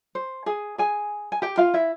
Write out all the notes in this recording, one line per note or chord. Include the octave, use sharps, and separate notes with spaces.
C5
G#4 G#5
G#4 G#5
G#5
G4 G5
F4 F5
E4 E5